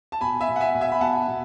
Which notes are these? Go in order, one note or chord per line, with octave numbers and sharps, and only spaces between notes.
A5
B2 G#5 B5
E5 G#5
B2
F#5
E5 G#5
B2
E5 G#5
B5
B2 F#5 A5
B2